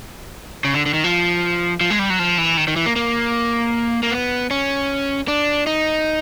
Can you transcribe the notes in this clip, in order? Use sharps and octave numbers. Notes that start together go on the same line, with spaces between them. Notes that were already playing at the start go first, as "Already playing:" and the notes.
C#3
D3
D3
D#3
F3
F3
G#3
G3
F#3
F3
E3
D#3
D#3
E3
A#3
A#3
A#3
B3
C#4
D4
D#4